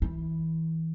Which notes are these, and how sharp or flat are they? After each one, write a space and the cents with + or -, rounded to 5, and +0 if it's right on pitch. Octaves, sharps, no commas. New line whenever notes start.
E3 -30 E4 +0